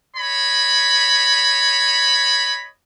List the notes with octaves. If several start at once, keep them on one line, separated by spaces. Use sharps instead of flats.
C#5 D#5 B5